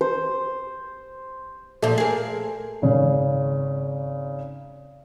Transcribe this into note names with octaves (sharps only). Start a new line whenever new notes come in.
C5
A#2 F3 A3
G#4 A#4
G#1 C#3